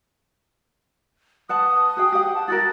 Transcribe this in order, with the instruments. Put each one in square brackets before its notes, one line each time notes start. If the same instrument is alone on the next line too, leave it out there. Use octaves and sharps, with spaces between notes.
[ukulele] B4 F#5 A5 [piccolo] D#6
[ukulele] F#4 G#4 G5
G4 F#5
[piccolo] A5
[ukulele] E4 F#4 A#4 [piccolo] A6